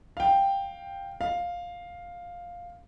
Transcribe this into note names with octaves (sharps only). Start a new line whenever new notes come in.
F5 G5
F5